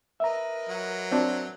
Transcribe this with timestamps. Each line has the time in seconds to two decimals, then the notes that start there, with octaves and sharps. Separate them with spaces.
0.20 A#4 B4 D#5 E5 A#5
0.69 F#3
1.11 C4 D4